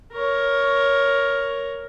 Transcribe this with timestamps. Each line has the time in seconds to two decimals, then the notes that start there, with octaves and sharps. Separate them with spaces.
0.13 A#4 C#5